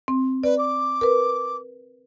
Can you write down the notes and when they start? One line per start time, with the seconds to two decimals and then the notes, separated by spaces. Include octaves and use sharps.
0.08 C4
0.44 B4 D5
0.58 D6
1.01 A#4 B4